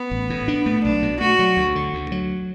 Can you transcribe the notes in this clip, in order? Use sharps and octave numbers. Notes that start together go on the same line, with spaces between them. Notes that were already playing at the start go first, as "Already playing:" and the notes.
Already playing: B3
A1
A2
D4
A3
B1 D4
B2
A3 F#4
F#3
D2
D3
D2
F#3